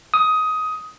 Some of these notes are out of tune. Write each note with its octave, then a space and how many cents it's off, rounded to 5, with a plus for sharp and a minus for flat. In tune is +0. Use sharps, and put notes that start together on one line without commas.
D#6 +15